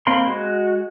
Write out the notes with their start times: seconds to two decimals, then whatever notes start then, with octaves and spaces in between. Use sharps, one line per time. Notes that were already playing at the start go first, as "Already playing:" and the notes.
0.07 A#3 C4 F5 B5 C6
0.27 G#3 F#4